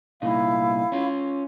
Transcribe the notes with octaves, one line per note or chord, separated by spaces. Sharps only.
C2 A#2 D#4 E4 F5
C#4 F4